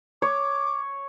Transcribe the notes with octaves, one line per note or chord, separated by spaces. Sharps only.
C#5 D6